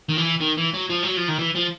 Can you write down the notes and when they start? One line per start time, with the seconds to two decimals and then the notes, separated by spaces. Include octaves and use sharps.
0.09 D#3
0.17 E3
0.41 D#3
0.57 E3
0.74 F#3
0.90 F3
1.03 F#3
1.17 F3
1.28 D#3
1.39 E3
1.55 F3